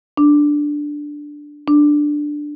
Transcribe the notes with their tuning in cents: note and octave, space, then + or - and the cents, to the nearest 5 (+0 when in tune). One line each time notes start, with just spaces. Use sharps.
D4 +0
D4 +5